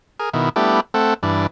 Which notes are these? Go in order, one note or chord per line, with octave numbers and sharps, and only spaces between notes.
G#4 A#4
B2 D#3 E4
G3 A3 B3 D4 E4 G4
A3 C4 A4 F#5
G2 E3 D4